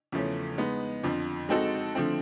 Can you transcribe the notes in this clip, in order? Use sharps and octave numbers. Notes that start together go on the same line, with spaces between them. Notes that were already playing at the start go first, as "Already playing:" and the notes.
E2 C#3 F3 A3 C#4
G#3 B3 D#4
F2 D3 F3
G#3 C4 D#4 F#4 A4
D3 F3 A3 C4